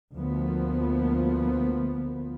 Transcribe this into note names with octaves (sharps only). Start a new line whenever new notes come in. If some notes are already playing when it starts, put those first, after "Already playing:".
D2 F3 A#3 B3